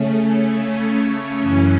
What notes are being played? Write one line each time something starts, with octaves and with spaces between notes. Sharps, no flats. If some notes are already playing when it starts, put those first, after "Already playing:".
Already playing: C#3 A3 C#4
F#2 C#3 E3 C#4